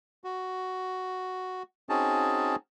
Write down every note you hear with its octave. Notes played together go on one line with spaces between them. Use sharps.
F#4
C4 C#4 D#4 F#4 G#4 A5